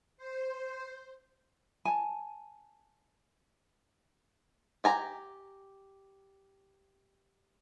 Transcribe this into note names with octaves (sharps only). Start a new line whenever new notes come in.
C5
G#5 A5
G4 G#5 A#5